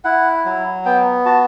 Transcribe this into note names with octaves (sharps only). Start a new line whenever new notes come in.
E4 F#5
F#3
B3 G5
F#4 A5